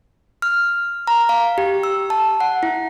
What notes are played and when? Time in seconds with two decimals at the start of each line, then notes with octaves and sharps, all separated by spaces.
0.42 F6
1.07 A#5
1.29 F5
1.58 G4
1.83 E6
2.10 A5
2.40 F#5
2.63 E4